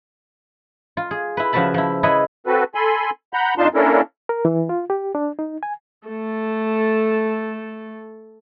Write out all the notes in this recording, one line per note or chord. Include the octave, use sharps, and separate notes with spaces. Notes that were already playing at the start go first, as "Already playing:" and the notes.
F4
G#4
E4 B4
C#3 F3 F#4 B4 A5 B5
F3 E4
E4 G#4 B4 C#5 D#5
C4 F#4 A4 B4
A4 G#5 B5 C6
F#5 A#5 B5 G6
F2 D4 D#4 F4 A5 C6
A#3 C#4 D4 E4 A4 A#4
A#4
E3
F4
G4
D4
D#4
G#5
A3 A4